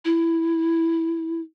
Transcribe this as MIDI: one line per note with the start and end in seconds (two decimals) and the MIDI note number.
0.05 1.41 64